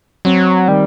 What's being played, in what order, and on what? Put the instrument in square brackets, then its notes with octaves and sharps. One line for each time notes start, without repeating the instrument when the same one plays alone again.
[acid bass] F#3 [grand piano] C4
[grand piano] D#3 [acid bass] G3